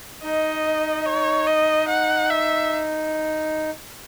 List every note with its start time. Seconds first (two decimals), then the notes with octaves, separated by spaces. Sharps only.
0.24 D#4 D#5
1.06 C#5
1.47 D#5
1.88 F#5
2.30 E5